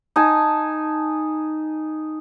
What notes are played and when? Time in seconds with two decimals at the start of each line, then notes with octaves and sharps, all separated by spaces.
0.16 D#4 G#5 A5